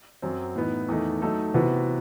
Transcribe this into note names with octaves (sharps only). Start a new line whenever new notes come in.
F#2 F#3 C4
A2 E3 B3 D#4
E2 D#3 A3 D#4
F#3 A3 D#4 A4
C3 E3 B3 F#4 B4